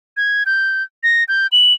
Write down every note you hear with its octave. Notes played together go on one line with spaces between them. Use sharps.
G#6
G6
A#6
G6
F#7